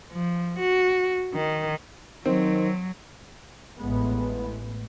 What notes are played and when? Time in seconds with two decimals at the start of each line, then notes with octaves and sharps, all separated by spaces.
0.13 F3
0.60 F#4
1.34 D#3
2.26 D#3 F#3 C4
3.79 A1 A2 G#3 B3